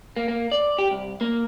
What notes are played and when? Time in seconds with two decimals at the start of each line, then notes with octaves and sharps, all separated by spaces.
0.16 A#3
0.28 A#3
0.52 D5
0.78 G4
0.91 C2
1.21 A#3